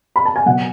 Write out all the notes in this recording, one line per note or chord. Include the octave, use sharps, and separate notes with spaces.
B5
A5
G#5
B2 F#3 F#5